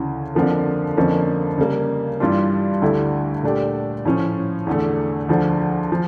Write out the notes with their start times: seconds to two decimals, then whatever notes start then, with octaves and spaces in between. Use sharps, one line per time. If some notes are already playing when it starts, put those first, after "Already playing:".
Already playing: D2 C#3 E3
0.35 F2 D3 F3 A#3
0.97 F2 D3 F3 A#3 C#4
1.58 C#3 G3 A#3
2.20 G2 E3 G3 D4 F4
2.82 D2 D3 A3 E4 G4
3.43 A#2 A3 D4 G4
4.05 A2 F3 C#4
4.67 E2 D3 A3
5.29 D2 D3 F3
5.92 F3